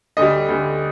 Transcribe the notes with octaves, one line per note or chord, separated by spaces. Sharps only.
D2 D3 G3 D#5
D2 D3 G3